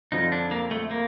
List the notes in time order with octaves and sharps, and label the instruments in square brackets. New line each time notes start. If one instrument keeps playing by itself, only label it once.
[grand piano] F2 D3 F3 [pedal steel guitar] D#4
[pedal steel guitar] D4
A#3
A3
A#3